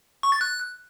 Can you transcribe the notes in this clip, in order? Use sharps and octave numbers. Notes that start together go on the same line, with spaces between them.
C#6
A6
F#6